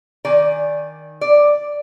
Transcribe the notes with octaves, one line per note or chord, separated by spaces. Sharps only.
D#3 D5 G#5
D5